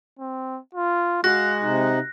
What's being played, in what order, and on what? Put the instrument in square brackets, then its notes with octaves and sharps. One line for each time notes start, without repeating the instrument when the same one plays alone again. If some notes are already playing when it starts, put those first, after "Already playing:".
[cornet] C4
F4
[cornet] G#3 [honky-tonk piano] F#4 [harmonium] F5 [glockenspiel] F#6 A#6
[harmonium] C3 D#4